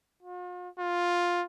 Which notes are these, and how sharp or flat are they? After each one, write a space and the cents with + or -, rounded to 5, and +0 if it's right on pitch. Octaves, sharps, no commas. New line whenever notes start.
F4 +45
F4 +10